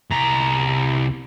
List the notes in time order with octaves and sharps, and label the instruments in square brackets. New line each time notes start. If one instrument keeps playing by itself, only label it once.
[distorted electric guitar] C2 A#5